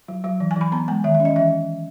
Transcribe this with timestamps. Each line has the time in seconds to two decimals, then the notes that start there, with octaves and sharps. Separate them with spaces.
0.08 F#3
0.24 F#3
0.40 E3
0.51 G#5
0.56 E3
0.61 B5
0.72 B3 A#5
0.88 G#3 G#5
1.04 D#3 E5
1.15 E5
1.20 C#4
1.25 D#5
1.36 E3 E5